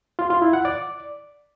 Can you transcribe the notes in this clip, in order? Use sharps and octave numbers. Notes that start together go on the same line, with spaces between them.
F4
F4
E4
F#5
D5